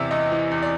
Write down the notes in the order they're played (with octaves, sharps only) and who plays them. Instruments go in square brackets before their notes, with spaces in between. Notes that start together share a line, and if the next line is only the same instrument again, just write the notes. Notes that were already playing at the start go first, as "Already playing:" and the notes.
Already playing: [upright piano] E2 C3 E3 D5 E5
E2 D#5
E3
E2
D5